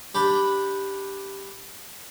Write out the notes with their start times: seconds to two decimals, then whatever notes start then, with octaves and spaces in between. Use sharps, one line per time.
0.15 D4 G4 D5 G5 B5